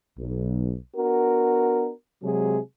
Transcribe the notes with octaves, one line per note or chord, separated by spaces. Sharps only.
B1
B3 D4 F#4 A#4
C3 F#3 G#3 F#4 G#4